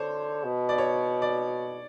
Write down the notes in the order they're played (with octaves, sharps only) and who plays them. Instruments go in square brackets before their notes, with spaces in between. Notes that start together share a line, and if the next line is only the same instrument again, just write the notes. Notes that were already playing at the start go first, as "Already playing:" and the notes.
Already playing: [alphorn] D3 [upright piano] C5 C#5
[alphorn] B2
[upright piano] D5
C#5
D5